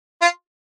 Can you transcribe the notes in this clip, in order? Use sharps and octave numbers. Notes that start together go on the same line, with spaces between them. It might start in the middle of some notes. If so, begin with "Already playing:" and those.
F4